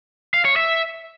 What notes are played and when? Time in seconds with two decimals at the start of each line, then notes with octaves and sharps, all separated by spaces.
0.34 F5
0.45 C#5
0.56 E5